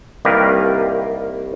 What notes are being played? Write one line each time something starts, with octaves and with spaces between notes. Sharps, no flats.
C2 D#3 G3 A#3 A#4 B4